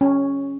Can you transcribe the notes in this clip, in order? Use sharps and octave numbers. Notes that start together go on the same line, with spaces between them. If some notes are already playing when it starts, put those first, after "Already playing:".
C#4